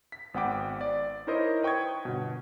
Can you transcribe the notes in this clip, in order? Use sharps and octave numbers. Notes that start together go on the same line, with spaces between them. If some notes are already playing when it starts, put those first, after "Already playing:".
B6
G#1 B3 F#5 G5 D6
D5
D#4 E4 A#4 C5 C#5 D#5
B4 G5 C#6 D#6 G#6
G1 B2